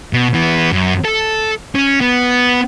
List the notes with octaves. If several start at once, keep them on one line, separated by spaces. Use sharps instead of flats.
B2
E3 B3
F#2
A4
C#4
B3